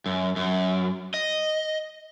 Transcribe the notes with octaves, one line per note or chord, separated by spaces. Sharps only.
F#2
F#2
D#5